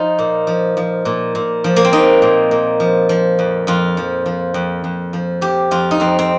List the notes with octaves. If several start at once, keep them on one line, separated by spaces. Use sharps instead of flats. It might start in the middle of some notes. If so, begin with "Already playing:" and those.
Already playing: F3 D#4 F4
A#2
F3
F3
A#2
A#2
F3
A#3
C4
F3 D#4
A#2
A#2
F3
F3
F2
F2 F4
F3
F3
F2
F2
F3
F3 G4
F2 F4
D#4
F2 C4
C4